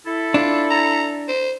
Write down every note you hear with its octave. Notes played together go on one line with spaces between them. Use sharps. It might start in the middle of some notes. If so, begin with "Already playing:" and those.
E4 A4
D4 F4
A#5
C5